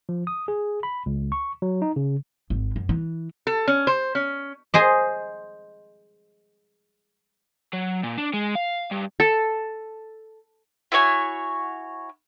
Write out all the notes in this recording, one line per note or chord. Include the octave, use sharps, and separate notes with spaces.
F3
D#6
G#4
B5
C#2
C#6
F#3
D#4
C#3
G#1
F#2
E3
A4
C#4
C5
C#4
G#4 C5 D#5
F#3
A#2
D4
G#3
F5
G2
A4
E4 F#4 C#5 G#5